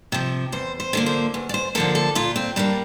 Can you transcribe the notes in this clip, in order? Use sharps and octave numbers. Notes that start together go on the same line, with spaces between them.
C3 F3
E2 C5
C5
D3 F3 A#3
C5
E2
D5
C5
D3 F3 A#3 A4
A4
A#2 F4
C4
G3 A#3 D4